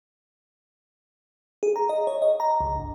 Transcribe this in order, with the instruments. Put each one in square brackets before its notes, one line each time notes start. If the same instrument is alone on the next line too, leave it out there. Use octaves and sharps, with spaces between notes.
[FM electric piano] G#4
A#5
D#5
C#5
D#5
A#5
C#2
G1